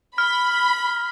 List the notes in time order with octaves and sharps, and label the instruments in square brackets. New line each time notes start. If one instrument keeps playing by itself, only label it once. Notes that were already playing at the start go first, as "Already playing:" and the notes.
[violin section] B5 [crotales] F6